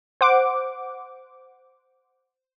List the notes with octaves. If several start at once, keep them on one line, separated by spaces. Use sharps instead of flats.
C5 F#5 D6